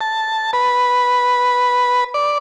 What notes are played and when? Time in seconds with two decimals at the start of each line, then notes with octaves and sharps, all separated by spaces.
0.01 A5
0.53 B4
2.14 D5